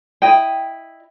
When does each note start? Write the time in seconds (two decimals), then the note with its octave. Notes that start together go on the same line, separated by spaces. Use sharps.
0.22 E4 D#5 G5